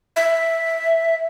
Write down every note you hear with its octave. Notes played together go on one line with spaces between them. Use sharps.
E5